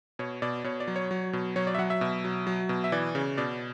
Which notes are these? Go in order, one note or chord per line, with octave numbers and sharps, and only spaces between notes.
B2 C#5
B2 D5
B2 C#5
D5
F#3
C#5
F#3
B2
F#3 C#5
D5
E5
F#3 F#5
E5
B2
F#3
F#3
B2
E5
E3 D5
C#3
B2 D5